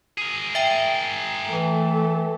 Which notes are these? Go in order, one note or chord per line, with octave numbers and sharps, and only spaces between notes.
G#4 A#4
E5 G5
E3 A3 A4